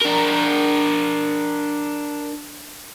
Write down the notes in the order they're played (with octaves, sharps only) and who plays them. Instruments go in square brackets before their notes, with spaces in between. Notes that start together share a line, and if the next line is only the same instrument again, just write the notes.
[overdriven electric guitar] D4 A#4